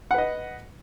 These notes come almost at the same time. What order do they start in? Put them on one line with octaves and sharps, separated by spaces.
F#5 B4 D#5